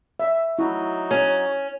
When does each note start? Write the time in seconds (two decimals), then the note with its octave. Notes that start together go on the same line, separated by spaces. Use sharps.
0.20 E5
0.59 F#3 D#4 E4 F#4
1.11 C#4